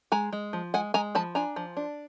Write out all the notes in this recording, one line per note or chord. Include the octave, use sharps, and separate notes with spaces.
G#3 G#5 A#5
G#3
F3
G#3 F#5 G#5
G#3 G#5 A#5
F3 A5 B5
D4 G#5 A#5
F3
D4